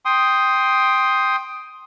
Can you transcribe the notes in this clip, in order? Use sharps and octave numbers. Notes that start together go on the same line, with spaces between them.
G5 C6 D#6